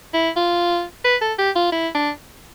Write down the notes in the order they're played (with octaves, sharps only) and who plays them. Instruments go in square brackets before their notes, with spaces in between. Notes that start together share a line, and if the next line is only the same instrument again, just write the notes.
[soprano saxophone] E4
F4
B4
A4
G4
F4
E4
D4